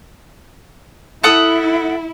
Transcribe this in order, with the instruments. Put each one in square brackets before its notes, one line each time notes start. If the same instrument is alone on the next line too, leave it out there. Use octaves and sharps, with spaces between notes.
[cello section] E4 [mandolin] A4 F#5 D#6